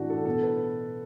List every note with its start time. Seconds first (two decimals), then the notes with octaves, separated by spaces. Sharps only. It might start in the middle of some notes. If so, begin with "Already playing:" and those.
Already playing: A2 E3 A3 D4 F#4
0.10 A4
0.25 B2 B3 A4
0.43 B4